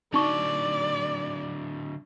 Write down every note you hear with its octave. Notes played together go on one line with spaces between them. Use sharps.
D3 F#3 D#4 D5 C#6